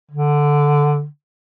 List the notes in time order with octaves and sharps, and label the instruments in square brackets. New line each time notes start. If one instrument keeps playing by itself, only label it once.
[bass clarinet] D3